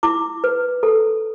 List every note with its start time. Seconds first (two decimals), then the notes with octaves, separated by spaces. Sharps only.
0.03 E4 D6
0.44 B4
0.83 A4